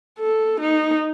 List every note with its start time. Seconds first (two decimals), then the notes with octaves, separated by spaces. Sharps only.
0.19 A4
0.60 D#4